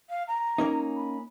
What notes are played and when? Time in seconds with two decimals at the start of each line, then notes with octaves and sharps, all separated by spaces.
0.09 F5
0.27 A#5
0.58 A#3 C#4 D#4
0.95 B5